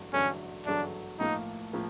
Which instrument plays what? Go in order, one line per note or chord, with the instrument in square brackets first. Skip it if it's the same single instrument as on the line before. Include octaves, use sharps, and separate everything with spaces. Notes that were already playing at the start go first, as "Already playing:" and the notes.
Already playing: [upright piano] A1 G2 D3 F#3 A3
[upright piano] A1 G2 D3 F#3 A3 [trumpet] C#4
[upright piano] A1 G2 D3 F#3 A3 [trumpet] D4
[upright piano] B1 A2 F3 A#3 [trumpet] D#4
[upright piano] A2 F3 A#3